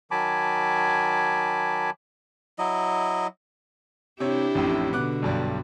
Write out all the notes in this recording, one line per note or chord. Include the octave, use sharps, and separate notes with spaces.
D#3 F#3 G#5 A5 B5 D6
F#3 E4 D#5
C3 D4 E4 G4 C#5
A1 F2 A2
B2 D3 B3 D6 F#6
B1 G2 G3